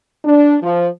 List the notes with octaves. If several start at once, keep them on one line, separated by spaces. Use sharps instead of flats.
D4
F3